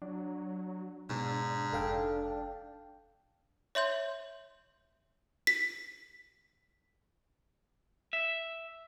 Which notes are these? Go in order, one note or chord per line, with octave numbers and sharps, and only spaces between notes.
F#3 D4
G#2 B2 D4
F1 A4 F5 G5
C#5 E5 C6 G6
B6
E5